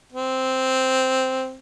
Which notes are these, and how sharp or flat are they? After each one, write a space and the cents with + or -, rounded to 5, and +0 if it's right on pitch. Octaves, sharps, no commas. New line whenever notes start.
C4 -5